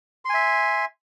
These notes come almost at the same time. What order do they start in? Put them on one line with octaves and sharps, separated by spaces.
C6 G#5 E5